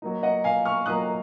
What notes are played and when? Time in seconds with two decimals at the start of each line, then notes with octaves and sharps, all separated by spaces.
0.02 F#3 A#3 D#4
0.23 D#5 F#5
0.44 F5 G#5
0.65 C#6 F6
0.86 F#3 A#3 D#4 D#6 F#6